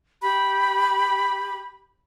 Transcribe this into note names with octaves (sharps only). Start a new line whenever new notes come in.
G4 B5